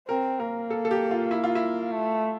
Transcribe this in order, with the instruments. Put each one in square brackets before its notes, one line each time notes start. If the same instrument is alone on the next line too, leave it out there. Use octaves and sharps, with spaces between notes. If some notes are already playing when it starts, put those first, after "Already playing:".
[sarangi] C4 [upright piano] A#4
[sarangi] A#3 [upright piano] A#4
[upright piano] A4
A4
G4
F4
E4
F4
E4
[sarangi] A3